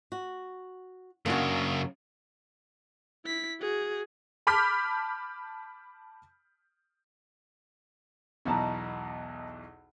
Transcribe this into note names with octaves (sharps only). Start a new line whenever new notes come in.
F#4
F#2 C#3 A#3 D4 F#4
E4 B6
F#4 G#4
A5 B5 D6 F6 G6 B6
B1 E2 B2 D#5 A5 A#5